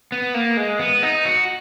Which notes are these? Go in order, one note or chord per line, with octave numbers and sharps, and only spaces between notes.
B3
A#3
G#3
B3
D#4
F#4